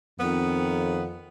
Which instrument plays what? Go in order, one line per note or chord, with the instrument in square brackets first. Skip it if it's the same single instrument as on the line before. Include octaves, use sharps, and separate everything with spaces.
[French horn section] F2 [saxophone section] D#3 B3